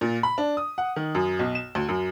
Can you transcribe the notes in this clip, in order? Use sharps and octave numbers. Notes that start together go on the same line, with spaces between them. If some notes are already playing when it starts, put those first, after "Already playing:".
A#2
B5
D4
D#6
F#5
D#3
F#2
B1
E7
D2
F#2